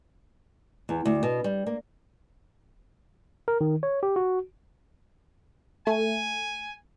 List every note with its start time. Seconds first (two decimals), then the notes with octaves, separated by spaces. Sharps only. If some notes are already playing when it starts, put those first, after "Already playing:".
0.89 E2
1.06 D2
1.23 B2
1.44 G3
1.67 A#3
3.48 A#4
3.61 D#3
3.83 C#5
4.03 G4
4.16 F#4
5.87 A3 G#5